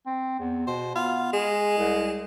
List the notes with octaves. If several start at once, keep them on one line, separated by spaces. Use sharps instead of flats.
C4
E2
B2 C5
B3 F4
G#3 G#4
C2